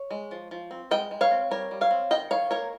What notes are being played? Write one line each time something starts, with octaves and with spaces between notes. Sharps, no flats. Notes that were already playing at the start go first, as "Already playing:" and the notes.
Already playing: C#5
G#3
F3
F3
C4
G#3 D#5 G5
G#3
C#5 F5
C4
G3 A#4 C#5
G3
C#5 F5
C4
D#3 D#5 G5
D#3 C#5 F5
A#3 A#4 C#5